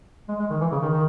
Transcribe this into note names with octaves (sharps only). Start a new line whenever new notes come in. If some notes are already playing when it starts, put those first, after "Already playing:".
G#3
G#3
D#3
E3
C#3
D#3
D#3